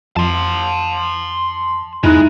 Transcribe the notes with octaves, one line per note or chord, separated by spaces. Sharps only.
F2 A5 C6
E2 G#3 D#4 E4 F#6